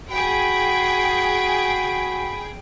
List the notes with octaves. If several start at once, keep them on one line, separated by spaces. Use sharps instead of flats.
F#4 G#4 G5 B5